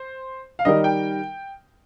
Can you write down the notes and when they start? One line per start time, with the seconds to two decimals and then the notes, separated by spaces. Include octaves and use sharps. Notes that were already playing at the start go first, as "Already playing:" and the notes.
Already playing: C5
0.59 F5
0.65 D#3 G3 D#4 A#4 D#5
0.84 G5